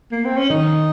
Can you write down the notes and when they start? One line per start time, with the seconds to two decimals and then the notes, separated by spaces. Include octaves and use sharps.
0.12 A#3
0.24 C4
0.37 C#4
0.50 D#3 D#4